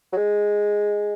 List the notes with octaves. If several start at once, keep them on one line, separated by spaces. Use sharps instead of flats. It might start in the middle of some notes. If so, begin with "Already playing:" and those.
F#3
G#3